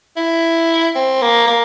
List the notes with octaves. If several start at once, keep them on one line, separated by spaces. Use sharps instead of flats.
E4
C4
A#3
A#3